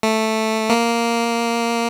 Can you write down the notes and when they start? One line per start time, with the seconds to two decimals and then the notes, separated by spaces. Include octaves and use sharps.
0.03 A3
0.70 A#3